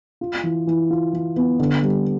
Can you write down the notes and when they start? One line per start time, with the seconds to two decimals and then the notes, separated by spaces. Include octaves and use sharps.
0.21 F4
0.43 E3
0.67 E3
0.90 F4
1.13 E3
1.36 B3
1.59 D3
1.83 G3